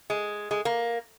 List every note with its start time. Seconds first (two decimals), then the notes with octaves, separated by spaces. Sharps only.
0.10 G#3
0.51 G#3
0.65 A#3